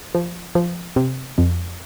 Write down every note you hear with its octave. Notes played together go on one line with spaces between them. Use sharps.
F3
F3
C3
F2